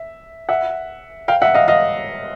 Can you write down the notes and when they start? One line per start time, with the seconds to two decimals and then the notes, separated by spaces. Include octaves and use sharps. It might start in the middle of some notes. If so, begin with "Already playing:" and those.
Already playing: E5
0.49 E5 F#5
1.28 F5 G5
1.42 E5 F#5
1.54 D#5 F5
1.68 D#5 F5